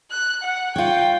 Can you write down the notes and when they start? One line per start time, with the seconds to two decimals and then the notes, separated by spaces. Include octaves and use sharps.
0.11 F#6
0.43 F#5
0.76 F4 C#5 G5